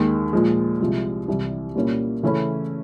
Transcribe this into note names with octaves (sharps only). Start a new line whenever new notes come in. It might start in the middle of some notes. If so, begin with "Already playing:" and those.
Already playing: D#2 D#3 G#3
A#2 F3 G#3
C2 C3 F3 G#3
C2 C3 E3 G3
A#2 G3 A#3 C#4 E4
C#3 E3 A3 C#4 E4